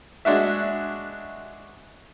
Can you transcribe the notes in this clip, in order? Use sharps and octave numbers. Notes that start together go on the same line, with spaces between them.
G#3 D4 F#4 E5